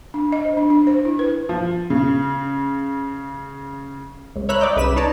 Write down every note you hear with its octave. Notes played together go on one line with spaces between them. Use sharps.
D4
D#5
C5
D4
D4
C5
E4
B4
F3
C#3
C#2
C#5 E5 A#5 B5 F#6 B6
E4 D5 D#5 G5
C2 C#3 B4 B5 B6 E7
D#4 C#5 D5 A5 A#5